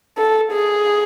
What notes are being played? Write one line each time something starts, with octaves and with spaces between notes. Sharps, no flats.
A4
G#4